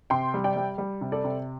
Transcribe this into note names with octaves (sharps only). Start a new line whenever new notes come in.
C3 G5 C6
G3
D5 G5
G3
G3
C3
A4 D5
C3